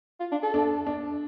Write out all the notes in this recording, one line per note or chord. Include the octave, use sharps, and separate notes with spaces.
F4
D4
A4
D4
D4